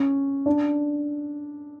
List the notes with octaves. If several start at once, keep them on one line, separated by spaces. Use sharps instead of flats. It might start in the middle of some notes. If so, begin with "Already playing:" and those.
Already playing: C#4
D4